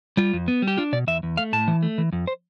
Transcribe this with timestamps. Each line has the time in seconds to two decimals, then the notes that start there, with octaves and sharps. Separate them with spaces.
0.17 G3 F4
0.33 F2
0.48 B3
0.62 G3
0.68 G4
0.78 D4 F4
0.93 B2 D5
1.07 E2 E5
1.23 E2
1.37 A3 F5
1.53 A2 A5
1.68 E3
1.83 A3
1.98 E3
2.13 F2
2.27 C5